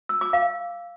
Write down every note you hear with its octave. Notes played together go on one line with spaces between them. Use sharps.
E6
D6
F5